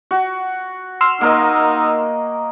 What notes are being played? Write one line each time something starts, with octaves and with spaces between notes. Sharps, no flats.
F#4
C6 E6 F6
A#3 D#4 A#4 D#5